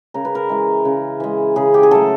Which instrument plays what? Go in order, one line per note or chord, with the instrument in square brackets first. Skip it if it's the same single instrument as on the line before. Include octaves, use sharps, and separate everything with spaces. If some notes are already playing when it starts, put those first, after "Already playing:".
[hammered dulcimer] C#3 A#4
B4
A#4
E3 G#3
C#3
E3 G#3
C#3 G#4
G4
G#4
F#3 A3 A4